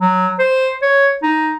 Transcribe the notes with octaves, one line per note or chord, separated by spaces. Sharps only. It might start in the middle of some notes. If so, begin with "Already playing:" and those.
F#3
C5
C#5
D#4